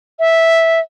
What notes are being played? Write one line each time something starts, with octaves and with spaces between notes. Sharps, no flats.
E5